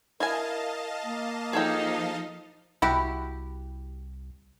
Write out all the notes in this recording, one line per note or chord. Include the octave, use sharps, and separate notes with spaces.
E4 A#4 D#5 F5 G#5 A5
A#3
F3 D#4 G#4 A4 G5
C2 E4 F#4 G4